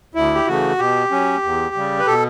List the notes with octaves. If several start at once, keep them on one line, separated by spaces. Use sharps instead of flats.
D2 E4
G4
C#3 E3 A3 F#4
B2 G4
F#3 C#4
E2
C#3 G3
B4
B2 A4